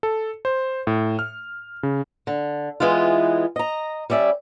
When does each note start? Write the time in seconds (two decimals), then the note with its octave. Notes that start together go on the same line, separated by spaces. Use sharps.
0.03 A4
0.45 C5
0.87 A2
1.19 F6
1.83 C#3
2.27 D3
2.80 E3 G#3 B3 F4
3.56 D#5 A#5
4.10 G3 C#4 D5 E5